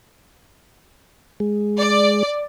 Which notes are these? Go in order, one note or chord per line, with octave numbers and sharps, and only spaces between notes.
G#3
D5